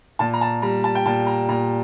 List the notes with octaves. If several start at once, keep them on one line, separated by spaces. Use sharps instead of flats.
A#2 A5
A#5
A5
G3 A#5
A5
G5
A#2 A5
A#5
A#2 A#5